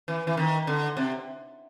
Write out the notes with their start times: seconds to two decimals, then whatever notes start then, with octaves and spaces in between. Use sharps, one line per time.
0.08 E3
0.27 E3
0.37 D#3
0.67 D3
0.97 C3